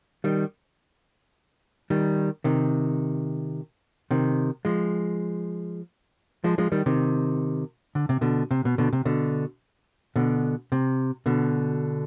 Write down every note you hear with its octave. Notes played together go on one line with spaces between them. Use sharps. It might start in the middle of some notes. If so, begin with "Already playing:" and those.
D#3 G3
D#3 G3
C3 D#3
C3 D#3
F3 G#3
F3 G#3
F3 G#3
D#3 G3
C3 D#3
D3
C3
B2 D3
C3
B2
B2 D3
C3
B2 D3
B2 D3
C3
B2 D3